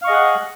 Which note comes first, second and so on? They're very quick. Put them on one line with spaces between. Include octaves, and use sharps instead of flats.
F5 C#6 D#5 G#4 F#5